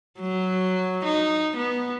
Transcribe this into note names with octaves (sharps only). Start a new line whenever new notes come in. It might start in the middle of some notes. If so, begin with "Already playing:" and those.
F#3
D#4
B3